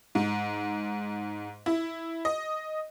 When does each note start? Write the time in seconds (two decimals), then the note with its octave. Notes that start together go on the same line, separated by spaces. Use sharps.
0.15 G#2
1.66 E4
2.25 D#5